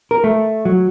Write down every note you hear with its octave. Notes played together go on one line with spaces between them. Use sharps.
A#4
A3
F#3